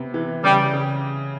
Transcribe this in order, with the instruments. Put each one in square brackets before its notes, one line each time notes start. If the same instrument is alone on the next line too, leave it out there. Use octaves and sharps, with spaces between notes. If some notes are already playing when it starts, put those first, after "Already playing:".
Already playing: [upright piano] C3 B3
E3
[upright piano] C#3 [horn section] G3
[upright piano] C#3